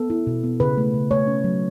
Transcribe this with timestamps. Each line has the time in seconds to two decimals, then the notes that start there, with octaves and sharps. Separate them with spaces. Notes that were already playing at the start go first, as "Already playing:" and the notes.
Already playing: B3 A4
0.10 E4
0.27 B2
0.44 B3
0.60 C#3 B4
0.78 A3
0.94 C#3
1.11 A3 C#5
1.27 C#4
1.44 F#3